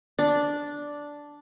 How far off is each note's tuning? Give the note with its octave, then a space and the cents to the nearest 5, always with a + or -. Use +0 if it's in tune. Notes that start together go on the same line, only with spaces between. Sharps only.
D4 -5